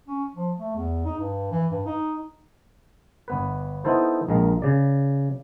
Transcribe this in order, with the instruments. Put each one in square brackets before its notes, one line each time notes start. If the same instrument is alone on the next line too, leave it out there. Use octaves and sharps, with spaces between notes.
[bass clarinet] C#4
F3
A3
E2
D#4
G2
E3
G2
D#4
[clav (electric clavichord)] G1 B3 B4
B3 D#4 E4 A4 C5
A#1 G#3 A#4 F5
C#3 D5